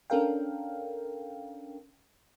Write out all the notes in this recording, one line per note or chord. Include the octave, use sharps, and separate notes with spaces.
C#4 D4 A4 A#4 F5 G5